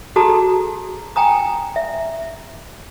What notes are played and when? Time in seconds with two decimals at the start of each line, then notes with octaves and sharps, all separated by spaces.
0.16 F#4 G#4 A4 A5 A#5 D#6
1.16 G5 G#5 A#5 D#6
1.76 E5